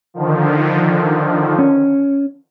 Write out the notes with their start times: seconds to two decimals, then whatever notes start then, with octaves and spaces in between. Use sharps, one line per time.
0.14 D3 D#3 F3
1.59 C#4